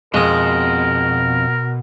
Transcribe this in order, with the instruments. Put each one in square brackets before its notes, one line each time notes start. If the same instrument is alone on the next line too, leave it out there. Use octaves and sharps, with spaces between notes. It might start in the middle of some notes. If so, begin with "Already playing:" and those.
[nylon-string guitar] F2 [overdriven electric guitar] B2 [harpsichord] G#3 G#4 [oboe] A#4